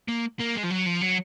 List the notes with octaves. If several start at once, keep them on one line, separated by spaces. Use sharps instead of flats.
A#3
A#3
G#3
F3
F#3
F3
F#3